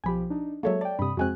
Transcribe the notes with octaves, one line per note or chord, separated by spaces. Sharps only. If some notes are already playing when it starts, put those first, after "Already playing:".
B1 F3 G4 G#5 B5
D4 D#4
F#3 G#3 A#3 A4 C#5 E5
D5 G5 A5
G2 C3 B5 D#6
F2 G#3 C4 F#4 G#5 F#6